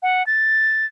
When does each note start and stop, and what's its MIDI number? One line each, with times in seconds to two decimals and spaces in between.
0.03 0.25 78
0.27 0.86 93